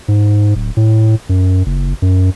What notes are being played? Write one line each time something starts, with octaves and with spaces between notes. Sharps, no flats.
G#2
D1
A2
F#2
F#1
F#2